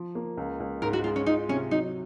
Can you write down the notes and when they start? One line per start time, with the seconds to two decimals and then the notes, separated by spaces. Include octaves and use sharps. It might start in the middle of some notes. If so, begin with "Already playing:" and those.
Already playing: F3
0.15 A#3
0.37 C#2
0.60 C#2
0.82 G#2 A#4
0.93 F#4
1.04 G#3 F4
1.16 C#4
1.26 D#4 F4
1.49 C3 C#4
1.71 F#3 D#4